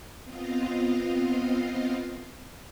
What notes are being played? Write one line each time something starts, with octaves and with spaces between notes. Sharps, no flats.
B3 C4 F4 D#5 F5